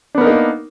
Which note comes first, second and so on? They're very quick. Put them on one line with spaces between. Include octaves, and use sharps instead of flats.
D4 B3 A#4 D#4 A#3